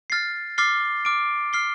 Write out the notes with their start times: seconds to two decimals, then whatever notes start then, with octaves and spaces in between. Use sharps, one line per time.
0.10 F6 A6 C7
0.58 D6 F6 A6 C7 G7
1.05 D6 F6 D7
1.53 F6 C7 G7